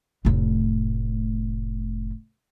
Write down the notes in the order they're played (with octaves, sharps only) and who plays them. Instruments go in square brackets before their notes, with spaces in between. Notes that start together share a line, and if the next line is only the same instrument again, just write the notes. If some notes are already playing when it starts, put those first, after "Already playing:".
[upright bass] F1 A2